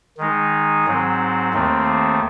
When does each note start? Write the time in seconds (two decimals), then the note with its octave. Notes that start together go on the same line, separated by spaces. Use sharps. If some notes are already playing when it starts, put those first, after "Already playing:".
0.18 D#3 G#3 D#4
0.86 G#2 F#3 C4
1.53 D#2 D#3 A3 C4